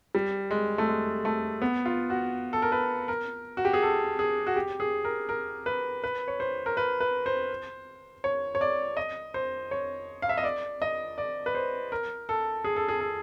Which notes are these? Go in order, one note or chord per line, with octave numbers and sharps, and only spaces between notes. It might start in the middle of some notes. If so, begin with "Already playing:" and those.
G3
G#3
A3
G#3
A3
B3
F4
F#4
A4
A#4
B4
A#4
F#4
G4
G#4
A4
G#4
F#4
G4
G#4
A#4
A#4
B4
B4
C#5
C5
A#4
B4
B4
C5
C#5
C#5
D5
D#5
C5
C#5
F5
E5
D#5
D5
D#5
D5
B4
C5
A#4
A4
G#4
A4
G#4
A4